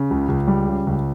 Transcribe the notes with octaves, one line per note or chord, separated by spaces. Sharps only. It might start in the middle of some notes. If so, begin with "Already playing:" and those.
Already playing: C#3
C#2
C#2
G3
C#3
C#2